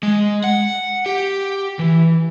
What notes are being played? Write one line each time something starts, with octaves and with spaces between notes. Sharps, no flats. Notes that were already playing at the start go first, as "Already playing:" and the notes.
G#3
F#5
G4
E3